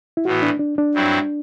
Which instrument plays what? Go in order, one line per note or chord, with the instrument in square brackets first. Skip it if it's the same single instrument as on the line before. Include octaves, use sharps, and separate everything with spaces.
[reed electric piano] E4
[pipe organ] A2 E3 B3 [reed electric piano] F#4
[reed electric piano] D4
D4
D4
[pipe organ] G2 F#3 C4 E4